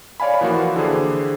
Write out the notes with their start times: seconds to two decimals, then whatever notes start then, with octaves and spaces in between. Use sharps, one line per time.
0.20 C#5 D5 F5 G#5 B5
0.41 E3 F3 A#3 F4 F#4
0.76 D3 E3 G4 G#4 C5